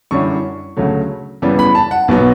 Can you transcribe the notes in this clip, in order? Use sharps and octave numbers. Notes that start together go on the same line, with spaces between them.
F#2 D3 G3 C#4 E4 C#6
D2 C#3 F#3 A3
F#2 C#3 E3 G3 B3
B5
A5
F#5
B1 B2 F#3 B3